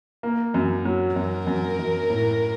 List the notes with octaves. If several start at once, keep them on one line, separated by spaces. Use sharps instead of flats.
A#3
F#2
F#3
F#2 A#4
F#2
F#2
A2